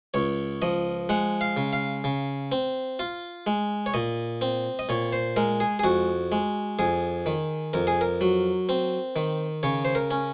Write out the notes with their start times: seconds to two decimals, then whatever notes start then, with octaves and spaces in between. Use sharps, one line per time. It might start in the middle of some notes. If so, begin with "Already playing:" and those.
0.14 C#2 C#5
0.62 F3 D#5
1.09 G#3 F#5
1.41 F5
1.57 C#3
1.73 F5
2.04 C#3
2.52 C4
2.99 F4
3.47 G#3
3.86 C#5
3.94 A#2 D#5
4.41 C4
4.79 D#5
4.89 A#2 C#5
5.13 C5
5.36 G#3 A#4
5.60 G#4
5.79 G#4
5.84 F2 F#4
6.32 G#3
6.79 F2 G#4
7.26 D#3
7.73 F2 A#4
7.87 G#4
8.01 A#4
8.21 F#3
8.69 C4
9.16 D#3
9.63 C#3 C#5
9.85 C5
9.95 A#4
10.11 C#4